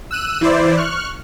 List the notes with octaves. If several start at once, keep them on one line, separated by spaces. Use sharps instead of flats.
E6 F#6 D#7
E3 E4 C5 D5
C#6 F6 F#6